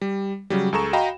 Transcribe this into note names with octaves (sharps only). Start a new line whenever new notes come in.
G3
C#3 F#3 G3
C#2 G#4 A4 A#5 C#6 E7
F#4 D#5 F5 G5 A#5 B5